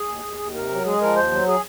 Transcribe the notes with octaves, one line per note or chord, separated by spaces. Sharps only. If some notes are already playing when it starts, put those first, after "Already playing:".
Already playing: G#4
D#2
D#2
D#2
C3 A#4
F#3
G#3 G#4
F3 A#4
D#2 C5
F#3
G#4